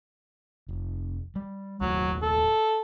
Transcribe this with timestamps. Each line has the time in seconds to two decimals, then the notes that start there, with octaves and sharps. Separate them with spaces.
0.69 F1
1.36 G3
1.81 D#1 D#2 F#3 A3
2.22 A4